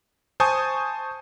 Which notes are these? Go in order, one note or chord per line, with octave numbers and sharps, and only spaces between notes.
C5 G#5 A5 C#6 D#6 G6